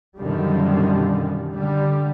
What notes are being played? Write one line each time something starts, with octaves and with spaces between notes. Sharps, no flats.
F#2 B2 D3 D#3 F3 G3
D3 G3